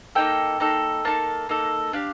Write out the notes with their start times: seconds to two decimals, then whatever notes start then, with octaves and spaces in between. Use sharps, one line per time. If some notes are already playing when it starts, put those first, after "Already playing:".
0.15 A#3 D#4 A4 G5
0.60 A#3 D#4 A4
1.05 A#3 D#4 A4 A5
1.49 A#3 D#4 A4
1.93 D4 G4 F5